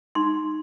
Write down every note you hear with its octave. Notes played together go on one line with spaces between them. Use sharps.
D#4 C6